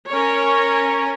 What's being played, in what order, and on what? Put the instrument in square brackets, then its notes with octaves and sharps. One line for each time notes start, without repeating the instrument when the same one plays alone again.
[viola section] C#4 A#4 C#5